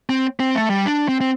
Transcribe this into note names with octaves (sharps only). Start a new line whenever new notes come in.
C4
C4
A3
G3
D4
C4
C4